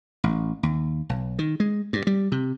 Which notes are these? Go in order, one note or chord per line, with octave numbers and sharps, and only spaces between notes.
A1
D#2
B1
D#3
G#3
G2
G3
C3